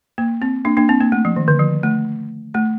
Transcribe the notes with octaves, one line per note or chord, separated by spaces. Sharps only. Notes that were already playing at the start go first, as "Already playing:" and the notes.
A#3
C4
A#3 D4
A#3 D4
C4
A#3
A3
F3
D#3
D3
F3
A3
A3